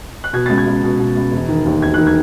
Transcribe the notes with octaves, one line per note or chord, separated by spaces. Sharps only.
F#6
B2 G#6
A6
C#2
G#6
C#2
B2
B2
C#2
E1
D#3
D#2
E1 G#6
F#6
D#3
G#6